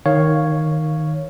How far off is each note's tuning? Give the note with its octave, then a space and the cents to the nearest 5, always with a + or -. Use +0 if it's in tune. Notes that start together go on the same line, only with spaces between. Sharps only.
D#3 +0 C#5 +0 F5 +0